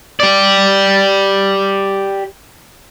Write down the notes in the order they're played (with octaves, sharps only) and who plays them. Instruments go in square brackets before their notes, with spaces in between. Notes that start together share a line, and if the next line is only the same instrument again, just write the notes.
[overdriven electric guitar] G4 D5